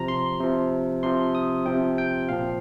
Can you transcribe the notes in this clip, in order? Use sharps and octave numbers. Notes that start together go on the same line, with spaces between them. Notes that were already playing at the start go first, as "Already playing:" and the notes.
Already playing: C3 F3 A#5
C6
C3 F3
C3 F3 C6
D#6
C3 F3 G5
G5
A#2 F3 F5